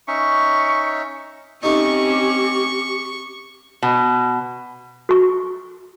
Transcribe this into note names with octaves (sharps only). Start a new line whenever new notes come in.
C#4 D#4 E5 C#6
A3 C4 C#4 D#4 G4 C#6
B2
F#4 C#6